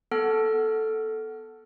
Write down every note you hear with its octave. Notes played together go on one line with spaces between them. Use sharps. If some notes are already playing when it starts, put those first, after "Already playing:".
B3 A4 F#5 A5 F6